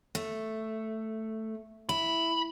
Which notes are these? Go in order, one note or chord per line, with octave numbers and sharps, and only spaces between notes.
A3
E4 B5